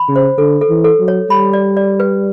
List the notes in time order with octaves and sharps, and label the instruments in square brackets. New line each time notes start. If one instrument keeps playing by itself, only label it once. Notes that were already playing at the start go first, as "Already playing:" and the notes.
Already playing: [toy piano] B5
[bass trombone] C#3
[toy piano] C5
[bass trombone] D3 [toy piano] A4
[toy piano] A4
[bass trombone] E3
[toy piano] A4
[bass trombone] F#3
[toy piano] C#5
[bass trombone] G3 [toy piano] B5
[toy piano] D5
D5
B4